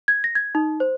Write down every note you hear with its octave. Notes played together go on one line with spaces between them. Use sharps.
G#6
A#6
G#6
D#4
C5